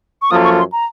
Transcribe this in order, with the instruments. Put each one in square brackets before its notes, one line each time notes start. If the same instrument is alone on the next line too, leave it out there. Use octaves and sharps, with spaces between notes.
[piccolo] C#6
[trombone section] F#2 F3 A#3 F4 A4 [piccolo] D#6
[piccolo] C#6
C6
A#5